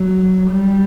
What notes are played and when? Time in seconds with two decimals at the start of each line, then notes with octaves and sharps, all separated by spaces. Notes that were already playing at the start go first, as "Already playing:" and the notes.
Already playing: F#3
0.50 G3